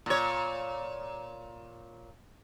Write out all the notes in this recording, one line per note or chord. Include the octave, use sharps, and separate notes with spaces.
A#2 C#5